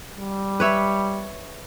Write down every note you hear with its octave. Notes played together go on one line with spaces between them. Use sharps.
G3
B4 C#5 E5